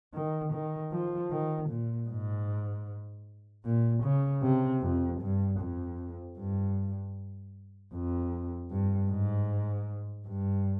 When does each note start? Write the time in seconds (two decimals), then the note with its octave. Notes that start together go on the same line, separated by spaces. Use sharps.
0.14 D#3
0.53 D#3
0.92 F3
1.31 D#3
1.69 A#2
2.08 G#2
3.65 A#2
4.03 C#3
4.42 C3
4.82 F2
5.21 G2
5.59 F2
6.38 G2
7.93 F2
8.71 G2
9.10 G#2
10.27 G2